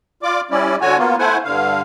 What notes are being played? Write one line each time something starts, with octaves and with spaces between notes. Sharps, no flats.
F4 D5 D6
G3 C#4 E4 D5
D3 F#4 C#5 G#5
A#3 B3 F4
A3 E4 C5 F#5 G#5
G2 D3 F5